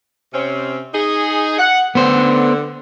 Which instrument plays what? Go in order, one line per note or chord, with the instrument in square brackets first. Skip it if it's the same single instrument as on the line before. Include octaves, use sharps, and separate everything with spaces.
[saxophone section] C3 C4 C#4
D#4 G#4
F#5
[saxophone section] D3 [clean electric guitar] B3 C5